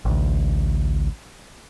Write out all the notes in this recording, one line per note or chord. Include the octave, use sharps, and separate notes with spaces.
A1 D2